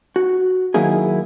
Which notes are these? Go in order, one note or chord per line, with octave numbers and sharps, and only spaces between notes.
F#4
D#3 F#3 A#3 D#4 E4 G#4